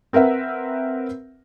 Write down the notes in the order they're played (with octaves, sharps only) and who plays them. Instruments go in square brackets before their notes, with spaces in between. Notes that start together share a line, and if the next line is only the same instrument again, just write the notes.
[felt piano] C4 A#4 B4 E5 F#5